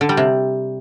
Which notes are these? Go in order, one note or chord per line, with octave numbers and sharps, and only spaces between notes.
D3
G3
C3